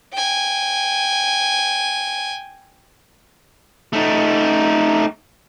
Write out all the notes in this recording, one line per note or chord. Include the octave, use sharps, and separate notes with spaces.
G5 G#5
A3 D#4